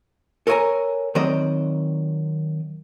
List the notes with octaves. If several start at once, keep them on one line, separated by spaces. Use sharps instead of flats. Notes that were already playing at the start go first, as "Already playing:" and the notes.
A4 A#4 C#5 D#5 G#5 A#5
D#3 F#3 C4 D5 D#5